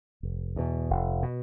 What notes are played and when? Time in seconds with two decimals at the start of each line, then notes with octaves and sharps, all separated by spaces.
0.23 F1
0.56 E2 B2
0.90 F1
1.22 B2